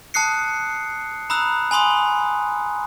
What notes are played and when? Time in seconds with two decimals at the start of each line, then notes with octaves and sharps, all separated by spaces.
0.14 A5 D#6 F#6 C7 C#7
1.30 A#5 B5 D#6 E6 F#6
1.71 G#5 B5 C6 D#6